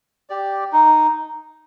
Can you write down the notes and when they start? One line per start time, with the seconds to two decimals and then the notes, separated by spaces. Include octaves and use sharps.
0.30 G4 D5
0.73 D#4